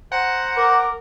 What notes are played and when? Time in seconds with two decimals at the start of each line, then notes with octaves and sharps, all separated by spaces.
0.12 C5 F#5 A#5
0.57 A#4 D6